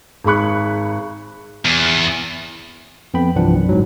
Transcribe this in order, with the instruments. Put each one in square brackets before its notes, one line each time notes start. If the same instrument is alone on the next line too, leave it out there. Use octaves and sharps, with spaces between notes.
[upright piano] G#1 G#3 G#4 B5 C#6 F#6
[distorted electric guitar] E2
[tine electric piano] F2 B3 G5 B5
C2 G2 E3 F3 D4 F#5
F#2
G1 G#2 F#3